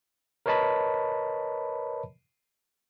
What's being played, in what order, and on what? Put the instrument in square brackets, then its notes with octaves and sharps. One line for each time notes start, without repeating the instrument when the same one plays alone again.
[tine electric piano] A#4 B4 C#5 D#5 A5 B5